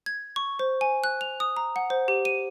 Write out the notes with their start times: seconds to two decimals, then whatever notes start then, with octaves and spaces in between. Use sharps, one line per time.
0.06 G#6
0.36 C#6
0.59 C5
0.81 G#5
1.04 F#6
1.21 F7
1.40 D#6
1.57 A#5
1.76 F#5
1.90 C5
2.08 G4
2.25 D#7